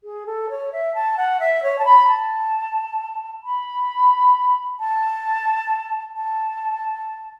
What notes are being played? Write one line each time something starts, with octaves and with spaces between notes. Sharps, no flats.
G#4
A4
C#5
E5
A5
F#5
E5
C#5
A5
B5
A5
B5
A5
A5